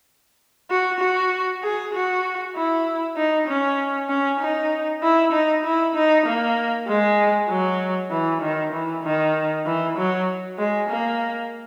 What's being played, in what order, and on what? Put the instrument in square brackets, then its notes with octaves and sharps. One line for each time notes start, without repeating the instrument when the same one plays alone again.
[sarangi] F#4
F#4
G#4
F#4
E4
D#4
C#4
C#4
D#4
E4
D#4
E4
D#4
A#3
G#3
F#3
E3
D#3
E3
D#3
E3
F#3
G#3
A#3